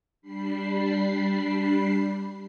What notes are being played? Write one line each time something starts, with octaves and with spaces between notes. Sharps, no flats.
G3 D4 B5 C7